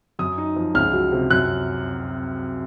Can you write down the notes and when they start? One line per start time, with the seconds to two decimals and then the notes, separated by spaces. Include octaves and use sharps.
0.19 F#2 D#6
0.38 D#4
0.56 F3
0.75 C#2 F6
0.93 F#3
1.12 C3
1.30 F#2 F#6